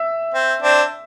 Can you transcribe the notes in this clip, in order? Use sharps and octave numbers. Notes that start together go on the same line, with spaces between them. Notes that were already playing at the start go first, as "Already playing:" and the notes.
Already playing: E5
C4
C4 D4